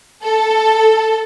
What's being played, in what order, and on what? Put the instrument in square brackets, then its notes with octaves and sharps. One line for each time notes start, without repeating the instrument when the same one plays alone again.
[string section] A4